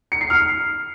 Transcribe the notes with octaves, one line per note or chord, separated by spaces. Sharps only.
C#7
C7
F6